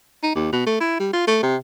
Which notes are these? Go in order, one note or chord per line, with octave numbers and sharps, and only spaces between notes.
D#4
D#2
B2
A3
E4
G3
F4
A3
C3